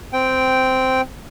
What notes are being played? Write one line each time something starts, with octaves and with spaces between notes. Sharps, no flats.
C4 G5